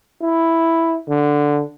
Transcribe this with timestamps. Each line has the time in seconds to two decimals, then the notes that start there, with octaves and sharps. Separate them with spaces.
0.21 E4
1.08 D3